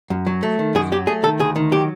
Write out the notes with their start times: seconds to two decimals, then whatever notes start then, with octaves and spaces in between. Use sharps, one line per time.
0.10 F#2
0.27 F#3
0.43 A3
0.59 D#3
0.75 F#2 G#4
0.92 F#3 G4
1.07 A3 G#4
1.23 D#3 A4
1.39 D2 G#4
1.56 D#3
1.72 F#3 G4